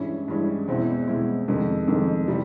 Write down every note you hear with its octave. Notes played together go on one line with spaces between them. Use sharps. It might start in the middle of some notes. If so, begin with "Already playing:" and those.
Already playing: G2 E3 G#3 C#4 E4
G2 E3 G#3 C#4 E4
E2 B2 G#3 C4 E4
E2 B2 G#3 C4 E4
F2 C3 D#3 G#3
F2 C3 D#3 G#3
C3 E3 G3